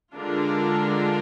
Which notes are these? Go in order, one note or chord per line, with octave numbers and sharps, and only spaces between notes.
D3 G#3 D4 F4 A#4